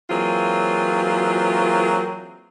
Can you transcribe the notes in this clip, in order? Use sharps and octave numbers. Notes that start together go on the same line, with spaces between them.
E3 F#3 A#3 C4 F4 G#4